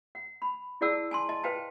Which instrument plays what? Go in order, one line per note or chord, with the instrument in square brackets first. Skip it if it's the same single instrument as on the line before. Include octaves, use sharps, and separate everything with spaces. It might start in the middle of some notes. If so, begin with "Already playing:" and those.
[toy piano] F#5
B5
E4 G#4 D5 F#5 A5 E6
G#5 A5 C6
D#5 A5
B4 C5 F5 G5 A5 A#5